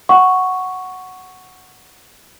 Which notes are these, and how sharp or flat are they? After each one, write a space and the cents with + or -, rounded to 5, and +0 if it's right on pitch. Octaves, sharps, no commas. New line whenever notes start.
F#5 +0 C#6 +0